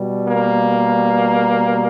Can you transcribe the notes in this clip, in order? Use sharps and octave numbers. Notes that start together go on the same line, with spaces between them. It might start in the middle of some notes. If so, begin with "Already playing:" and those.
Already playing: B2 G3
A#3